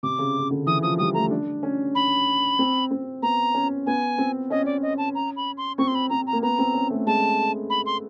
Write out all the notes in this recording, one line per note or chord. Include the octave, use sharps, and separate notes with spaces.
C3 D6
C#3
C#3
D3
E3 D#6
F3 D#6
G3 D#6
A3 A#5
D4
C#4
B5
C4
C4
B3 A#5
C#4
B3 G#5
C4
C#4 D#5
D5
D#5
A5
A#5
B5
C6
C4 C#6
C6
B5
C4 A#5
A#5
A#3
B3 A#5
C4
C#4
A3
G#3 A5
B5
C6